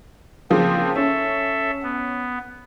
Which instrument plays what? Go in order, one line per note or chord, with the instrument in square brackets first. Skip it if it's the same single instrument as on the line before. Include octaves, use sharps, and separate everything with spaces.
[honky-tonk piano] C#3 F3 A#3 [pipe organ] C4
[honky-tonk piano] C#4 [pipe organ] A4 E5
[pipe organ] B3